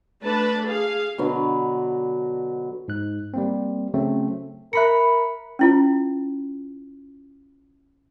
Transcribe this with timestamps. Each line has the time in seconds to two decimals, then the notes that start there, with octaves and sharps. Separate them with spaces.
0.22 A3 D4 B4 A5
0.66 G#4 F5
1.18 B2 D3 F#3
2.88 G#2 F#6
3.34 G3 A#3 C4
3.94 C#3 F#3 A3 C4 C#4
4.73 A#4 E5 A#5 B5 F#6 C#7
5.59 C#4 E4 F4